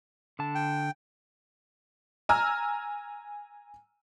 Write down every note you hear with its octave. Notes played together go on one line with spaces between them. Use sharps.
D3 A5
G5
G#5 A#5 E6 F6